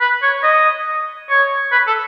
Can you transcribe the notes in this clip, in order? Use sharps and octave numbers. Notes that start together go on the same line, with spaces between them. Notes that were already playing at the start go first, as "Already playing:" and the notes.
B4
C#5
D#5
C#5
B4
A4